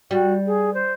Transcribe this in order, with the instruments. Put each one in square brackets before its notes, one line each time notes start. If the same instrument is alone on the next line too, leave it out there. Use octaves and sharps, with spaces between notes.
[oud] G3 [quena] F#4
[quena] G#4
C5